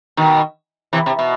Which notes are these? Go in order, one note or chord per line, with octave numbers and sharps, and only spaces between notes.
B2 D#3
C3 E3
C3
B2